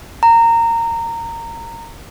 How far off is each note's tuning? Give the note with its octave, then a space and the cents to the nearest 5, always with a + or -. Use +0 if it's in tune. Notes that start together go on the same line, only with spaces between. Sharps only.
A#5 -20